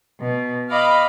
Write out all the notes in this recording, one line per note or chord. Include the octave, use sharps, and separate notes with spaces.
B2
D#5 F5 B5 D6